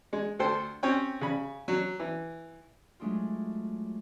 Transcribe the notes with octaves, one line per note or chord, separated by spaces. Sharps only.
G#3
D2 A4 C5 G5 C6
C4 C#4 C#5 G5
C#3 B5
F#3
E3
F#3 G#3 A3 D4 D#4 F4